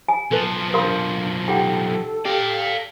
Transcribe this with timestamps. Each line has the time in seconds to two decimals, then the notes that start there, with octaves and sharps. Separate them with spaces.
0.09 G#5
0.31 B1 F3 A4 B4
0.74 D3 A#4 C5 F5 C6
1.48 D#4 G4 A4 F#5 G5
2.25 G4 D5 F5